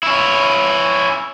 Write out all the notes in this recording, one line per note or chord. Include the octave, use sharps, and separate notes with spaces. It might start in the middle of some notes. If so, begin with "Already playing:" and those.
C#4 E4